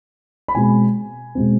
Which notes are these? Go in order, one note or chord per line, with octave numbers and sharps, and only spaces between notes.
B5
B2 G#3 C4 G#5
B2 G#3 C4